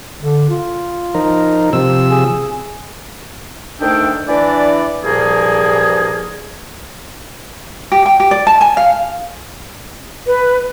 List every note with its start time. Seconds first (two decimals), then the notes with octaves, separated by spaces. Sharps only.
0.22 D3
0.50 F4
1.15 F3 D#4 A#4
1.73 C3 F3 E6
2.10 G#4
3.80 D2 D#3 A3 D4 A4 G5
4.28 E3 D4 D5
5.04 C2 G2 A#2 F3 A#3 G#4
7.92 G4
8.06 G5
8.20 G4
8.31 D5
8.47 A5
8.61 G#5
8.77 F5
10.27 B4